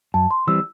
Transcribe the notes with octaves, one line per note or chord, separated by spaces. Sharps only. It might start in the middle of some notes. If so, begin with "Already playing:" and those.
F#2 A5
C6
E3 G3 C4 E6